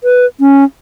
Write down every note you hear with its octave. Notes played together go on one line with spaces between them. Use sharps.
B4
C#4